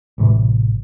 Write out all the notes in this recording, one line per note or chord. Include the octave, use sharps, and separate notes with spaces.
A1 G2 C3 E3